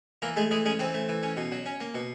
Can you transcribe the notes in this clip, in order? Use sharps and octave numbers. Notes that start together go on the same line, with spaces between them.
E3 A#3 A#4
G#3 A3 G#4
E3 G#3 G#4
G#3 C#4 G#4
E3 C4 C5
A3
E3
C#4
B2
F#3
C#4
A#3
B2